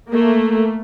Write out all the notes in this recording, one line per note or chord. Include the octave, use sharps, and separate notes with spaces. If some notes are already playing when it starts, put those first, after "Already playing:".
A3 A#3